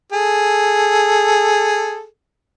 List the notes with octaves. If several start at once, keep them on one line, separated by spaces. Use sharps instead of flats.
G#4 A4